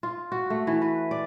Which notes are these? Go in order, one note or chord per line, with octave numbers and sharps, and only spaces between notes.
F4
F#4
A3
E3
B4
D5